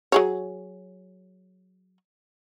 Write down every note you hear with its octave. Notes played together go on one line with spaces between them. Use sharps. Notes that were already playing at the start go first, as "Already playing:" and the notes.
F#3 G#4 C#5